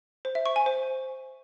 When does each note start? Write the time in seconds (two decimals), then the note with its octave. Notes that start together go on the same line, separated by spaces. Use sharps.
0.25 C5
0.35 E5
0.46 C#6
0.56 G#5
0.66 C5